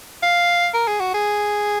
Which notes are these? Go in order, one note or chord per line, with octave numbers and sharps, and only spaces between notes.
F5
A#4
G#4
F#4
G#4